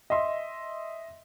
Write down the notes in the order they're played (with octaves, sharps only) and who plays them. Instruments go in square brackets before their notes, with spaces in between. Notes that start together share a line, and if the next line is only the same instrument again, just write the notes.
[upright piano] D#5 E5 C6 E6